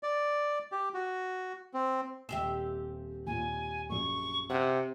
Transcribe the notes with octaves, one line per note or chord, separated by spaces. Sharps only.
D5
G4
F#4
C4
D#1 C4 G4 E5 E7
D#2 A#2 G#5
A#1 F#2 C#6
C3 F#5